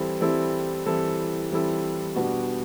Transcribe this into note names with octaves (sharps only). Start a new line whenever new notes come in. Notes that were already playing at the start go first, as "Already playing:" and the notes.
Already playing: E3 G3 C4 E4 A4
E3 G3 C4 E4 A4
E3 G3 C4 E4 A4
E3 G3 C4 E4 A4
B2 G3 B3 D4 F#4